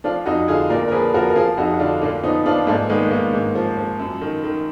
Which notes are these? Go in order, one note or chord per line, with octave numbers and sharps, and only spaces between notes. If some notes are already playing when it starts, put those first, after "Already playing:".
F3 D4 F4
F2 D#4 F#4
D3 F4 G#4
A#2 A#4 D5
A#4
F3 G#4 B4
F3 F#4 A#4
A#4
F3 F4 G#4
F2 D#4 F#4
F#4
D3 D4 F4
A#2 A#3 D4
F3 B3 D#4
F3 D4 F4
G#2 A#3 D4
D#3 G#3 B3
B3
D#3 A#3
G#2
F3
F3
F#2
D#3
D#3